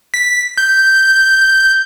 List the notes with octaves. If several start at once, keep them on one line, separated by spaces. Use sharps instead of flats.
B6
G6